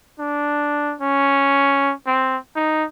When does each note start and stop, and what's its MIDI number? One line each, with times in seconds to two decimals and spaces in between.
0.19 0.94 62
1.01 1.93 61
2.07 2.37 60
2.56 2.84 63